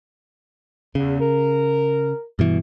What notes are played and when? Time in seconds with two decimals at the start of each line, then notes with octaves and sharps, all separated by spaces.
0.95 E2 C#3
1.20 A#4
2.39 G2 B2 E3